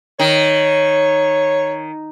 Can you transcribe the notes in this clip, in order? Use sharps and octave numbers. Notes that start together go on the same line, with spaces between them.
D#3 C#5